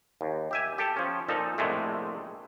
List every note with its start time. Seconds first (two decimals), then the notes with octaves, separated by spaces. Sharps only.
0.21 D#2
0.51 G4 E5 G#5
0.78 G4 A4 G5 A5
0.96 F3 C#4
1.28 A#2 F3 D#4 A4
1.58 A#1 A2 C3 G#3 A3